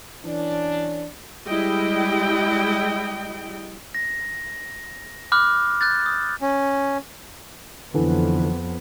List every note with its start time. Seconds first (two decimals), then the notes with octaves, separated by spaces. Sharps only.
0.24 E3 C#4 D4
1.47 G3 G#3 E4 D#5 G5
3.95 A#6
5.32 B5 D6 F6 F#6
5.81 F#6 G6 A6
6.06 D#6
6.42 C#4
7.94 F2 D3 E3 B3